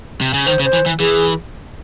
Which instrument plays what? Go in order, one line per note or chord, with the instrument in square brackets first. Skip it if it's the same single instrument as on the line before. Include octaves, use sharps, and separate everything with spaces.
[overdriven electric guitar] C3
C#3
[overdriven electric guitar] D#3 [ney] C5
[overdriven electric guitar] C#3
[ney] C5
[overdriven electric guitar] E3
E3
[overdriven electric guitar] E3 [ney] G#4